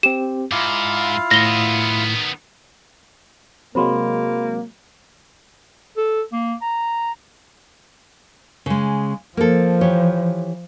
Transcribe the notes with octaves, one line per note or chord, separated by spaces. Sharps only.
C4 G4 E7
G#2 E4 F4 F5 D6
A2 D#3 B3 A#6 G7
C3 F#3 G#3 A#3 C5 B5 C6
A4
A#3
A#5
C#3 G#3
F3 A#3 A4
E3 G4 C#5